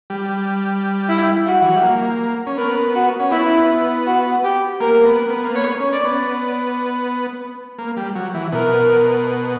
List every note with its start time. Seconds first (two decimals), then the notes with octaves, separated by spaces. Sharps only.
0.10 G3
1.09 E4
1.46 F#4
1.62 E3
1.69 F#3
1.76 G3
1.83 A#3
2.47 C#4
2.58 B3 A#4
2.95 F#4
3.20 C#4
3.31 B3 E4
4.07 F#4
4.44 G4
4.80 A#3 A#4
4.95 A#3
5.05 B3
5.30 B3
5.44 A#3
5.54 B3 C#5
5.80 C#4
5.93 D5
6.05 B3
7.78 A#3
7.97 G3
8.15 F#3
8.34 E3
8.52 B2 A#4